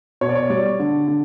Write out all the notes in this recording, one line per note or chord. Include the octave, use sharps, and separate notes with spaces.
B2 C#5
D5
C#5
G3 D5
D3
D3